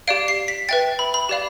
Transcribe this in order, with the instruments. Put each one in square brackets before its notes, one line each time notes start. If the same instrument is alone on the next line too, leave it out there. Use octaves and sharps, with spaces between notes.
[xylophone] G4 D5 F5 D7
C7
B6
B4 E5 G5 A6
B5
B5
G4 D5 F5